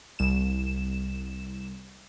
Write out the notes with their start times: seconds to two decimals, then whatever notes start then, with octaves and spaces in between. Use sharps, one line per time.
0.19 C2 E7